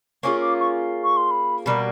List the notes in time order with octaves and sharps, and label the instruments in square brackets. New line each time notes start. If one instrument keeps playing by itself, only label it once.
[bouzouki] A#3 C#4 F4 G#4 [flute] C#6
[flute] D6
C#6
C#6
C6
B5
[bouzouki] B2 G3 A#3 [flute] B5